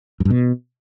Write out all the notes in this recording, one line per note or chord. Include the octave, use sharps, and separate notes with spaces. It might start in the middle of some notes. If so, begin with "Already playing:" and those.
F#2
G2
B2